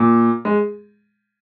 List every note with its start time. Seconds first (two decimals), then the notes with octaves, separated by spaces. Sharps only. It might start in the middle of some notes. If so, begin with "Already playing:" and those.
Already playing: A#2
0.45 G#3